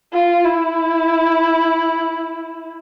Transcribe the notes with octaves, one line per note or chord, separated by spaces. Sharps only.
F4
E4